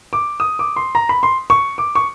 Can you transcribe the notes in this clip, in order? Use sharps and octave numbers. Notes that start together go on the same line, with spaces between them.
D6
D#6
D6
C6
A#5
B5
C6
C#6
D6
C#6